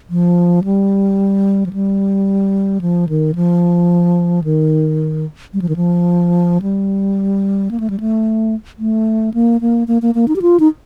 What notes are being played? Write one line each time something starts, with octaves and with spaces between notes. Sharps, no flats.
F3
G3
F3
G3
F3
D#3
F3
D#3
G3
F3
D#3
F3
G3
A#3
A3
G3
A3
A3
A#3
A#3
A#3
A#3
A#3
D#4
G4
F4
D#4